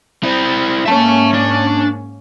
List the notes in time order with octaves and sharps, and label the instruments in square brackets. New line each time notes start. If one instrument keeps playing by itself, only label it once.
[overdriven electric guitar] C4 E4
[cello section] G#2 A#3 C#4 [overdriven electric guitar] E5 A5
[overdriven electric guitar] D4